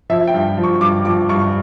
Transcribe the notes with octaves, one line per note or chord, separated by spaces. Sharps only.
F3 E5
G5
G2
F3
C#6
G2 D6
F3 D6
G2 C#6